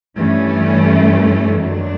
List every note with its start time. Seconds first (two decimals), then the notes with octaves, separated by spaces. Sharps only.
0.17 G2 E3 A3 C#4
1.60 F#2 D#3 F#3 A3 D4